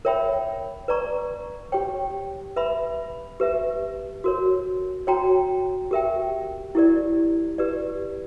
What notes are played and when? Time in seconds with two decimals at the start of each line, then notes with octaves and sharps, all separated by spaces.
0.05 A#4 C#5 E5 G5 B5
0.88 B4 D5 A#5 C#6
1.72 G4 C#5 G5
2.56 B4 E5 B5
3.40 G4 B4 E5
4.24 F#4 A#4 C#5
5.07 F#4 C#5 G5 A#5
5.91 G4 A#4 E5 G5
6.75 E4 G4 A#4 D5
7.58 G4 B4 D5